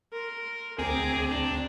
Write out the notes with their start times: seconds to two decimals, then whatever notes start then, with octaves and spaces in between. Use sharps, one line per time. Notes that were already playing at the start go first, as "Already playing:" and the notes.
0.12 A#4 C6
0.79 D2 C4 G#4 A#5 D6
1.32 D4